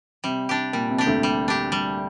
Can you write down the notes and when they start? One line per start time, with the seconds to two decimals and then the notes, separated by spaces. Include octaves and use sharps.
0.24 C3 G3
0.49 D4 G4
0.73 A#2 G3
0.90 C3
0.98 D4 G4
1.06 D2 D3
1.23 G3
1.48 D4 G4
1.72 G3